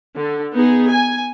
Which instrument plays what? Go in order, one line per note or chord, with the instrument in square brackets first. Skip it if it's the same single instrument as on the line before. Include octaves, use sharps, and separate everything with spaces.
[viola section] D3
B3 D#4 G#4
G#5